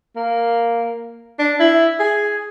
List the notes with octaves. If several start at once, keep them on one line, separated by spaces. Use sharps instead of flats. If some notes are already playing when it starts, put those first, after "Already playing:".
A#3
D4
E4
G#4